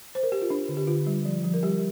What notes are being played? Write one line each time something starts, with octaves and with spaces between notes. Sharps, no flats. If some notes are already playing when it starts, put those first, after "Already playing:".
C5
A#4
G4
F4
D4
D3
G4
D3 F4
G3
F3
F3
A#4
G3 G4